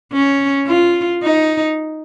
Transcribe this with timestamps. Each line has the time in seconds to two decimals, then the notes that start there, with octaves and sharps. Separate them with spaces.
0.13 C#4
0.67 F4
1.23 D#4